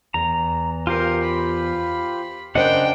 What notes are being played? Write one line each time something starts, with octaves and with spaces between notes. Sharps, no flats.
E2 A#5
F4 G4 A#4 C5
B5
C#3 D4 A#4 C5 D#5 F#5 G5